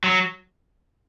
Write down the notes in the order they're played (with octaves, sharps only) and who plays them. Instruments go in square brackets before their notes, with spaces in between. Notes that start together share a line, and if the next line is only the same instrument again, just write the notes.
[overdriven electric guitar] F#3